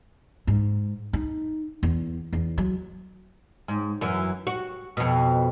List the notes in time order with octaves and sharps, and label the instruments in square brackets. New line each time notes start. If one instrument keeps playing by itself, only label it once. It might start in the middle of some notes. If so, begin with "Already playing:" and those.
[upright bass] G#2
D#4
E2
E2
F#3
[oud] G#2
F#2 E3
F#4
F2 B2